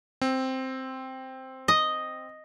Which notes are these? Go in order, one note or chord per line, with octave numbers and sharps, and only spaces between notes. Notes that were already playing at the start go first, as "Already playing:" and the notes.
C4
D#5